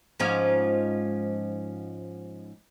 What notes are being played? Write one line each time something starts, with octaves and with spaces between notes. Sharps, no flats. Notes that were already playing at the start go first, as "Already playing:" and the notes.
G#2 F3 C#4